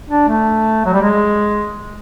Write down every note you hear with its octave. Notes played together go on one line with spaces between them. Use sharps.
D4
A3
F#3
G3
G#3